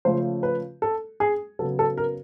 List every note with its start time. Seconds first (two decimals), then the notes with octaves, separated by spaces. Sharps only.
0.05 C#3 F3 A3 C5
0.43 B4
0.82 A4
1.20 G#4
1.59 C#3 F#3 B3 A4
1.79 A4
1.98 A#4